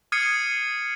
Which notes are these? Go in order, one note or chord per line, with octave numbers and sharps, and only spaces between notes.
D#6 F6 G#6 C7 C#7 D#7